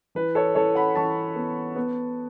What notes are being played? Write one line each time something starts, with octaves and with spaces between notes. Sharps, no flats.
E3 B4
A4 C#5
E3 A4 C#5
F#5 B5
E3 A5 C#6
B3
B3